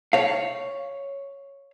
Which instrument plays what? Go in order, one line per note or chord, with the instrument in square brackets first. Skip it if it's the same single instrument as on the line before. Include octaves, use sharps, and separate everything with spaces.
[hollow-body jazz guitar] C#5 F5